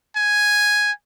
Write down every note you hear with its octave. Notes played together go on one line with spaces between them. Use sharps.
G#5